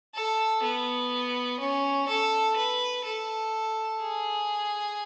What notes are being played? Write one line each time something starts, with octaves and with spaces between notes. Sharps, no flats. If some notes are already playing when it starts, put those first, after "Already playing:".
A4
B3
C#4
A4
B4
A4
G#4